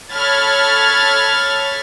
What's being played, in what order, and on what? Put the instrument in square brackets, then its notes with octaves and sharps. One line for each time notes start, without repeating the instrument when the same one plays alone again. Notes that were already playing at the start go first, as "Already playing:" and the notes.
[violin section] A4 C#5 B5 F6 G#6 A6